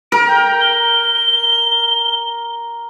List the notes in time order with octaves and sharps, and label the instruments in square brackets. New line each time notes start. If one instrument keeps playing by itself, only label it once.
[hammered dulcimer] A#4 [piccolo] D7
[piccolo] G5
G7